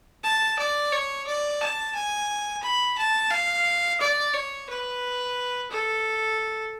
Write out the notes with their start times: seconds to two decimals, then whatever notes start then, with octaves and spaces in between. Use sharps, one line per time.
0.23 A5
0.58 D5
0.92 C#5
1.27 D5
1.61 A5
1.94 G#5
2.63 B5
2.98 A5
3.31 F5
4.00 D5
4.34 C#5
4.69 B4
5.71 A4